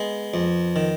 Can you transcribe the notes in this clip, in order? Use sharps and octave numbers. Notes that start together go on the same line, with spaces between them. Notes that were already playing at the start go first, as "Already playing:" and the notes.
Already playing: G#3 B3
F2
D#3